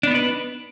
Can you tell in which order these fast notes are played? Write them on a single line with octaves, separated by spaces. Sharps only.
D4 B3 D#4 B4